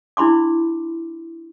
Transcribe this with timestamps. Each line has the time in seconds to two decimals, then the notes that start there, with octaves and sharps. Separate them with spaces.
0.17 D4 E4 B5 C6 D6